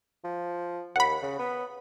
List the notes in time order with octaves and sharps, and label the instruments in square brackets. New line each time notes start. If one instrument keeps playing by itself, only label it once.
[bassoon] F3
[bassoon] D#2 [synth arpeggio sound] F#5 B5
[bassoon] C#3
B3